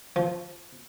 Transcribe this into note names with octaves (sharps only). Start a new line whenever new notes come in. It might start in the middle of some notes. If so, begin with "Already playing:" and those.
F3